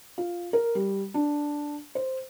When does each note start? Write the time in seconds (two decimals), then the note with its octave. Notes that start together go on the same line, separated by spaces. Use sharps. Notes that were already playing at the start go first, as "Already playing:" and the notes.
0.18 F4
0.53 A#4
0.75 G3
1.14 D4
1.95 C5